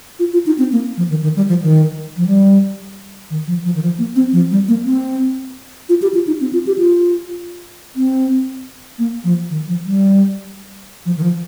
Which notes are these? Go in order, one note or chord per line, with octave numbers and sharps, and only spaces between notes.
F4
F4
D#4
C4
A#3
F3
D#3
D#3
G3
F3
D#3
F3
G3
D#3
F3
F3
D#3
F3
A#3
C4
F3
G3
A#3
C4
F4
G4
F4
D#4
C4
F4
G4
F4
C4
A#3
F3
D#3
F3
G3
F3
D#3
F3